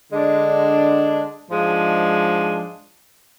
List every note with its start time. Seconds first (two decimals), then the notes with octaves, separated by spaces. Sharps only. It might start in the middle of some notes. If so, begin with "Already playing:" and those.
0.12 D3 G#3 D4
1.49 G#2 F3 G#3 D4